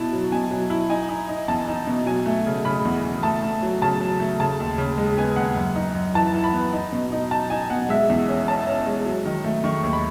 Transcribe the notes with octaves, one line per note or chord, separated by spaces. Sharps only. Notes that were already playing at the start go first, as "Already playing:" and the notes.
Already playing: B2 E4 A5
F#3
B2 G#5
F#3
E4
D#4 G#5
D#4
D#4
E2 A5
D#4
B2
F#3 G#5
A3
C#3
C#3 B5
E2
E2
A3 A5
A3
F#3
C#3 A5
F#3
A3
C#3 A5
D#2
C#3
G#3
B3 G#5
D#2 F#5
F#2
D#4
F#2
E3 A5
E3
B5
B3
D#4
B2
D#4
D#4 A5
D#4 G#5
B2 F#5
G#3 E5
E2
C#4
C#4 A5
C#4
G#3
F#3
D#3
A3
D#3 C#6
D#2
B5